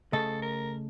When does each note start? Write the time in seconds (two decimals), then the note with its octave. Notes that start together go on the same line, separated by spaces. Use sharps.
0.13 C#3 A3 A4 D#5
0.42 A#4